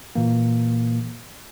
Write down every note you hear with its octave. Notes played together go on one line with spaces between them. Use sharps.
A#2 E3 A#3